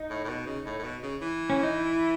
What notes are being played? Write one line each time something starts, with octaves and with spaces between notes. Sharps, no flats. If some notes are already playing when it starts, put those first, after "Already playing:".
Already playing: D#4
A2
A2
B2
C#3
A2
A2
B2
C#3
E3
C#4
D#4
E4